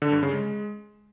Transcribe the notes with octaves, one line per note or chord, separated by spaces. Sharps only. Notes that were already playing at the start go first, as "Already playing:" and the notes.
D3
G2
C#3
G#3